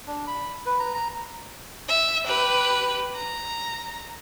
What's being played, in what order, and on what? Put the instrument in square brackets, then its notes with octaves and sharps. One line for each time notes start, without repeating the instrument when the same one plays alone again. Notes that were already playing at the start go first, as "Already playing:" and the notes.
[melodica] D4
B5
B4
A#5
A#5
[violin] E5
G4 B4
A#5